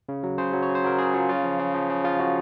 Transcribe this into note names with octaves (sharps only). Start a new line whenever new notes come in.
C#3
F#3
C#3 C5
F#3
C#5
C#3
C5
F#3 A#4
C#3 G#4
F#3 F4
C#3 F4
F3
C#3
F3
C#3
F3 F4
C#3 F#4